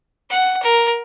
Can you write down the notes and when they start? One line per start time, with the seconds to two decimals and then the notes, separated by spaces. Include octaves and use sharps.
0.30 F#5
0.63 A#4